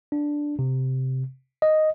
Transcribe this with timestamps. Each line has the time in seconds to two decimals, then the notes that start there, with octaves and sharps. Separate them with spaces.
0.12 D4
0.59 C3
1.62 D#5